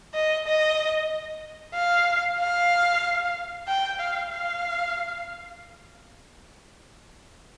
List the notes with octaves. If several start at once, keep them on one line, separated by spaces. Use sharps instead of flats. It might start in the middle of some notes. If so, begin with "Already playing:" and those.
D#5
D#5
F5
F5
G5
F5
F5